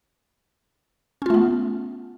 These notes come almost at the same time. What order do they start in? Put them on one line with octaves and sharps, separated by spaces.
C#4 F4 A3 B3